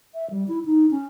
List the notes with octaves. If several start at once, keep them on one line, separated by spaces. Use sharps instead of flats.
E5
G3
E4
D#4
C#4